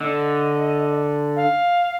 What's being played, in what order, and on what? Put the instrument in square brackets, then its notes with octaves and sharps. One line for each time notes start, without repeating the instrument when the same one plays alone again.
[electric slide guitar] D3 [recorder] D#5
[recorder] F5